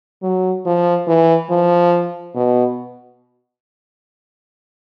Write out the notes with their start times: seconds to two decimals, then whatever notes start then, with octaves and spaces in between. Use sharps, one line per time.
0.23 F#3
0.66 F3
1.07 E3
1.50 F3
2.35 B2